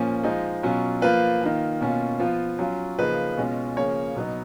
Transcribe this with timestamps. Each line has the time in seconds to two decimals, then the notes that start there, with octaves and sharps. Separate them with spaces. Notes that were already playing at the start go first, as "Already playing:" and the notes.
Already playing: A#2 F3 A#3 C#4
0.23 F3 G#3 D#4
0.63 B2 F#3 C#4 F4
1.02 F3 A#3 F4 B4
1.41 D#3 A#3 F4
1.81 B2 A#3 C#4 F4
2.20 F3 B3 F4
2.59 F#3 C#4 F4
2.99 C#3 F3 A#3 D#4 B4
3.37 B2 G#3 C#4 F4
3.76 C#3 F3 A#3 C#4 C#5
4.15 B2 F#3 B3 D#4